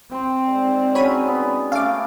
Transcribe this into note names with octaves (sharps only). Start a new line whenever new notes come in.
C4 G5 C6
G#3 D#4 D5
F#3 C#4 C#5 B5 D#7
B3
A3 C#4 F5 D6